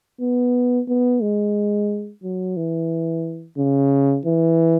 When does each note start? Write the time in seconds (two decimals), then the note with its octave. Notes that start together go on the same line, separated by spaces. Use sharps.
0.20 B3
0.88 B3
1.21 G#3
2.23 F#3
2.56 E3
3.58 C#3
4.25 E3